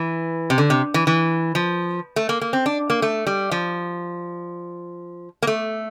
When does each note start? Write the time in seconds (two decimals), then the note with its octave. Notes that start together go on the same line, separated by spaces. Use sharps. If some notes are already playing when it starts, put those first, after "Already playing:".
Already playing: E3
0.50 C3
0.58 D3
0.70 C3
0.94 E3
1.07 E3
1.55 F3
2.16 A3
2.29 A#3
2.42 A#3
2.53 C4
2.66 D4
2.90 A#3
3.02 A3
3.27 G3
3.51 F3
5.43 A#3
5.47 A3